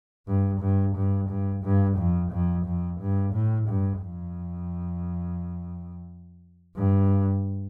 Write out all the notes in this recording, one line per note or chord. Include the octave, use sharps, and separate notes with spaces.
G2
G2
G2
G2
G2
F2
F2
F2
G2
A2
G2
F2
G2